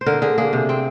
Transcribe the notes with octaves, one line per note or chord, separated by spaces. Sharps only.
C5
D3 A#4
D3 G#4
A#3 G#4
C3
C4